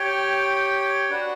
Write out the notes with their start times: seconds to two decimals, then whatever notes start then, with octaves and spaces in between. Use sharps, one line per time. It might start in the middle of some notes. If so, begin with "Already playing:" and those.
Already playing: G4 C#5 G5
1.10 D4 F#4 B4 F#5